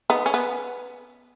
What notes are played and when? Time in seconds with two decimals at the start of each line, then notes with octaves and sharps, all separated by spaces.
0.10 B3 D#4
0.26 C#4
0.34 B3